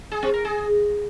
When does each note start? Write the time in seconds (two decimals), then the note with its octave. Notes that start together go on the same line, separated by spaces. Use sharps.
0.11 G#4
0.23 C4
0.34 A#4
0.45 G#4